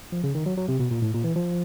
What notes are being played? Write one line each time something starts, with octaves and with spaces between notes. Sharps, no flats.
F3
C#3
D#3
F#3
F#3
C3
B2
A#2
A2
A#2
E3
F3